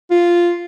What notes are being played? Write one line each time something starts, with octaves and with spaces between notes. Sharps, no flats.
F4